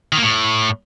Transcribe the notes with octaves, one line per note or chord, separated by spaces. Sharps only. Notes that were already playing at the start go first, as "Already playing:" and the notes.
D#3
A#3
A2